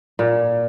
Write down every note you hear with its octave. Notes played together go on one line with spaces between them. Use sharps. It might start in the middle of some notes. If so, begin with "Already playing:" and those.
A#2